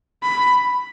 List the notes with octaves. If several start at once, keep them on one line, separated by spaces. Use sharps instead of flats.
B5